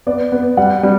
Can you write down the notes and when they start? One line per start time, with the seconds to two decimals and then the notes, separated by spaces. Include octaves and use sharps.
0.07 B3 D5
0.32 B3
0.57 G3 F#5
0.83 G3